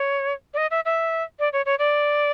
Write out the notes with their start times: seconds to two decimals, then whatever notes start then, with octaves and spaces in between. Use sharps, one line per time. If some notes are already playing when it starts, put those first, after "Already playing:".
Already playing: C#5
0.54 D5
0.57 D#5
0.71 E5
0.85 E5
1.39 D5
1.53 C#5
1.66 C#5
1.79 D5